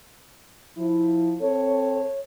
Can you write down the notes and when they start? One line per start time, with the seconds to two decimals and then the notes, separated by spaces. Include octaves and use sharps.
0.76 F3 E4
1.40 C4 A4 C#5